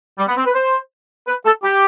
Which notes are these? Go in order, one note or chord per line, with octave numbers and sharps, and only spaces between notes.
G3
B3
C4
B4
C5
B4
A4
G4